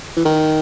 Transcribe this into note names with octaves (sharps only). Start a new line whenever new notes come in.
E3
D#3